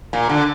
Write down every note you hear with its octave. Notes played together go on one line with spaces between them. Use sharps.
A#2
D3